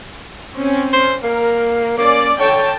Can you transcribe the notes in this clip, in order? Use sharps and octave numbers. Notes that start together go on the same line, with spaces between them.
C4 C#4
C5
A#3 A#4
A#3 C#4 D5
D3 C#5 G5 A5